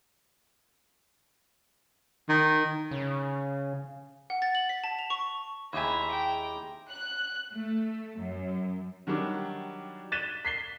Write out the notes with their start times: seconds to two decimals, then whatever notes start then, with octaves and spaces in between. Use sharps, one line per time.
2.29 D#3
2.91 C#3
4.30 F#5
4.42 A6
4.55 F#7
4.69 B6
4.84 A5
4.99 F7
5.10 C#6
5.73 D#2 G#3 E4 G4 E5 G#5 A#5
6.12 G5
6.90 F#6
7.52 A3
8.18 F#2
9.07 D#3 F#3 G3 D4
10.12 F#6 A6 B6 D#7 E7 G7
10.45 B6 C7 G7